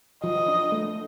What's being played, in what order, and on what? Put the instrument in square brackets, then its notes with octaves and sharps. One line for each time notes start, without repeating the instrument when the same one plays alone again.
[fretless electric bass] F3 [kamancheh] D#5
[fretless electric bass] D4
A3